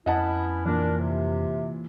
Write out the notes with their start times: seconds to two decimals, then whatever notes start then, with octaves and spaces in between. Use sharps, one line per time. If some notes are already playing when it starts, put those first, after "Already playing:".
0.06 F2 B3 C#4 E4 D#5 F#5 A5
0.66 A#2 E3 D4 A#4
0.98 C3